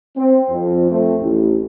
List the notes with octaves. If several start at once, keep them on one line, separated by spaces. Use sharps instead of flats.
C4
F2
A3 C4
A1